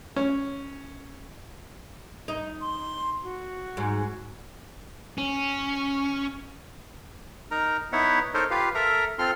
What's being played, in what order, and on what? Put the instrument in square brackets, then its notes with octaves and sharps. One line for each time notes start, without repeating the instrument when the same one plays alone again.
[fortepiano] C#4
[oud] D#4
[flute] C6
F#4
[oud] G#2
[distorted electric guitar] C#4
[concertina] D#4 A#4 A#5
B3 D#4 E4 C#5 E5 F#5
D#4 A4 A#4 C5 C#5 D#5
F4 G4 B4 F5
A4 A#4 E5 A#5
C4 F4 A4 C6 F6